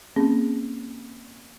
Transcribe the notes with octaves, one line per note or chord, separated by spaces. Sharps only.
A#3 C4 C#4 G#4